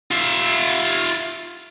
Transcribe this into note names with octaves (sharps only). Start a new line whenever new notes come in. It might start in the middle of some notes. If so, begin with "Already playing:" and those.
F4 E5